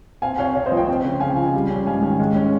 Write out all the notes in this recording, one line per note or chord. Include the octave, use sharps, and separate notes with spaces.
C4 F5 G#5
C3 C#5 F5
C3 C#5 F5
C5 D#5
F3
D#5 G5
C4
C#3
C#3 F5 G#5
F3
G3
C#4
G#2 F5 G#5
D#3
G#3
C#4